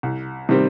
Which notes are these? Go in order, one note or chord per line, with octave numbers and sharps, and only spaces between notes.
C2
C3 D#3 G3 C4